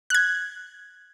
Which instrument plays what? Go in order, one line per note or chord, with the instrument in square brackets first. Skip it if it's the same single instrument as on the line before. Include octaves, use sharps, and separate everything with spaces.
[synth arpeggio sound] F#6 G#6